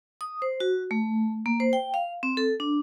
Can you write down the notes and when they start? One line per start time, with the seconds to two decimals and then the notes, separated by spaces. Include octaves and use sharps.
0.21 D#6
0.42 C5
0.60 F#4
0.91 A3
1.46 A#3
1.60 C5
1.73 G5
1.94 F5
2.23 C4
2.37 A4
2.60 D4